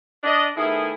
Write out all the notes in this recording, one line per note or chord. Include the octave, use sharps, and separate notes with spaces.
D4 D#5
D#3 A3 B3 E4 G#4